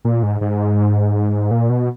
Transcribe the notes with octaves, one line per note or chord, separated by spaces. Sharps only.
A#2
G#2
G#2
A#2
B2